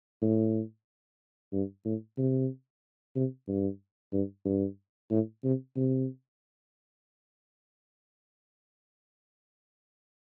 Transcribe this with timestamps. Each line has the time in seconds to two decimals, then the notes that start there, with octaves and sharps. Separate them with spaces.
0.22 A2
1.53 G2
1.85 A2
2.18 C3
3.16 C3
3.48 G2
4.12 G2
4.45 G2
5.10 A2
5.44 C3
5.76 C3